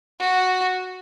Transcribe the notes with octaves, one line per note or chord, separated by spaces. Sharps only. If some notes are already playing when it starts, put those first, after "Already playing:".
F#4